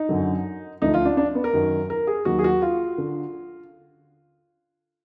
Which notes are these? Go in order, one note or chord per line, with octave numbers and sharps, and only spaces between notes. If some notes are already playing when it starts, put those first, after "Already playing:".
Already playing: D#4
F#2 D3 F#3
D2 D3 F3 D#4
F4
D4
D4
B3
A#4
F#2 D#3 F#3
A#4
G#4
D#2 D#3 F#3 F#4
G#4
F#4
F4
D3